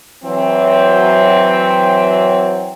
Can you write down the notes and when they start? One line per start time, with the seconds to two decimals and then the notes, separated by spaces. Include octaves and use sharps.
0.24 E3 F#3 C4